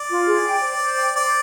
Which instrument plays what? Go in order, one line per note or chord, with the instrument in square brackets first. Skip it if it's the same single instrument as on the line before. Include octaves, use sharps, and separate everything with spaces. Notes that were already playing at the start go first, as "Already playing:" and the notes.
Already playing: [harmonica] D5
[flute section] F4
G#4
G5
C5
C5
G5
[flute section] C5 [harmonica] D5